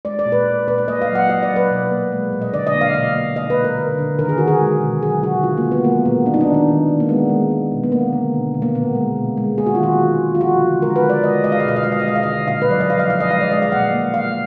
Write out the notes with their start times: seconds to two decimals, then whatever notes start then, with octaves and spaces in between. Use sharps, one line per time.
0.05 G#3 D5
0.19 D5
0.26 A#2
0.32 B4
0.46 A#2
0.67 A#2 B4
0.78 D5
0.88 A#3 D#5
1.02 F5
1.09 F#3
1.15 F#5
1.29 A#3 D#5
1.43 D5
1.50 F#3
1.56 B4
1.71 B2
1.91 A#3
2.12 G#3
2.33 A#2
2.42 D#5
2.54 D3 D5
2.67 D#5
2.74 A#3
2.81 F5
2.94 B2 F5
3.15 A#3
3.36 G#3 D#5
3.50 B4
3.57 A#2
3.64 A#4
3.77 D3
3.98 D3
4.19 D#3 A#4
4.29 G#4
4.38 D#3 F#4
4.48 G#4
4.60 G#3
4.81 B2
5.03 F#3 G#4
5.23 D3 F#4
5.43 G#3 F4
5.57 A#3
5.65 G#3
5.72 B3
5.84 G#3 A#3
6.05 A#2 B3
6.26 A#3 D4
6.34 D#4
6.41 D4
6.47 D#3
6.54 D4
6.68 D#3
6.88 D#3
7.00 A#3
7.09 G#3 B3
7.30 G#3
7.51 A#3
7.71 B2
7.83 B3
7.92 G#3 A#3
8.13 D3
8.33 B2
8.54 B2
8.62 A#3
8.75 A#2 B3
8.95 G#3
9.16 B2
9.37 G#3
9.58 A#3 G#4
9.66 F#4
9.75 F4
9.79 D#3 F#4
9.99 D#3
10.20 G#3
10.35 F4
10.41 F3 F#4
10.61 D3
10.82 G#3 A#4
10.96 B4
11.03 G#3
11.10 D5
11.23 G#3 D#5
11.44 G#3 D#5
11.52 F5
11.60 D#5
11.65 B2 F5
11.76 D#5
11.84 G#3 F5
11.92 D#5
12.00 F5
12.06 G#3 D#5
12.16 F5
12.23 D3 D#5
12.48 A#2 F5
12.62 B4
12.69 F#3 D5
12.80 D#5
12.89 F3 F5
12.99 F5
13.10 F3 F5
13.20 D#5
13.31 G#3 F5
13.41 D5
13.51 G#3 D#5
13.62 F5
13.72 A#2 F#5
13.93 A#3
14.14 A#3 F5